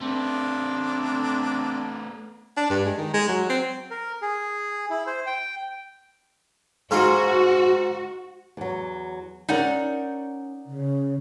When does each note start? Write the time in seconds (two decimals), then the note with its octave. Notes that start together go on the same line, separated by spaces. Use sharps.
0.02 A3 B3 C4 D4
2.57 D4
2.70 G2
2.85 G#3
2.98 D#3
3.13 G#3
3.28 F#3
3.49 C4
3.91 A#4
4.22 G#4
4.90 E4
5.07 C5
5.26 G5
6.91 G#2 F4 F#4
8.57 E2 F#3
9.49 C#4 D#4 A#4 D5 F#5
10.66 C#3